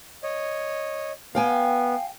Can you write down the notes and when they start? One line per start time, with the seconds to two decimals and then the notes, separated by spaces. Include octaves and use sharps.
0.23 C#5 D#5
1.35 B3 F5 G5 G#5